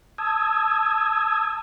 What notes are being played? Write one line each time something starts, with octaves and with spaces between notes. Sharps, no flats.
A5 D#6 E6 G#6